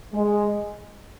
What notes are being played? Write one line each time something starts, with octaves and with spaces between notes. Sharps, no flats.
G#3